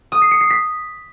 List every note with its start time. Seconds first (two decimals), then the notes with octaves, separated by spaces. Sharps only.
0.12 D#6
0.22 C7
0.31 C#7
0.41 C7
0.50 B6